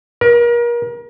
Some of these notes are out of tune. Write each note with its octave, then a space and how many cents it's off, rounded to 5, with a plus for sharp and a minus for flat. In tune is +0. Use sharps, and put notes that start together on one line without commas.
A#4 +35